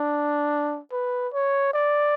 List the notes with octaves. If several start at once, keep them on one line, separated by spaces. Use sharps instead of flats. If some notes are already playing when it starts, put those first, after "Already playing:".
Already playing: D4
B4
C#5
D5